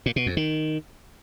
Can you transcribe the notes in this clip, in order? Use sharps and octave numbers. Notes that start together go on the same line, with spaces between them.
A#2
B2
F2
D#3